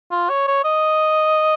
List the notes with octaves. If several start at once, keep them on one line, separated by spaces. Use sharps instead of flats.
F4
C#5
C#5
D#5